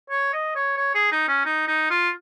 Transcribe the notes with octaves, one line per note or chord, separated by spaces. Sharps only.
C#5
D#5
C#5
C#5
G#4
D#4
C#4
D#4
D#4
F4